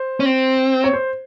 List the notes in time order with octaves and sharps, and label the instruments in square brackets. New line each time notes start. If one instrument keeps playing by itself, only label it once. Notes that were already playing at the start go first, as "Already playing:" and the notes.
Already playing: [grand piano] C5
[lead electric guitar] C#4
C4
[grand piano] C#5
C5